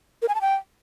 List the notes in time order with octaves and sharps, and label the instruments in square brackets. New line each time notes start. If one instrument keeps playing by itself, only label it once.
[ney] A#4
G#5
A5
G5